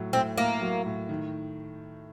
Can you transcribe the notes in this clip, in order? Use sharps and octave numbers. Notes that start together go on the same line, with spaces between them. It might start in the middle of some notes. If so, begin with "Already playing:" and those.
Already playing: A2 F#3
A2 C4
A2 A#3
F#3
A2
D#3